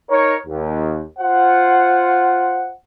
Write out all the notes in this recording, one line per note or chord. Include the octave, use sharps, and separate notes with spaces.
D#4 A#4 C#5
D#2
F4 C5 F#5